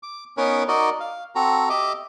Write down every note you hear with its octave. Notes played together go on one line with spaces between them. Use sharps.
D6
B3 C#4 D#4 A#4 B4 C#5
D#4 F#4 A#4 D5 D#5
F5
C4 F#4 A4 A#5
G4 D#5 E5 D6